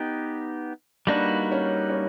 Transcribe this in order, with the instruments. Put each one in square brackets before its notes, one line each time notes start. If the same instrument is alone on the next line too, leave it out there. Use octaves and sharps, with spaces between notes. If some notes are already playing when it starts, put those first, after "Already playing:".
Already playing: [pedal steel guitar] B3 D#4 G4
[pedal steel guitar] G3 A#3 D#4 F#4 B4 [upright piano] D4
[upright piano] C#4
C#4